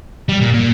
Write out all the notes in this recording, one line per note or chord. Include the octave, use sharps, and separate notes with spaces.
G3
A#2
A#2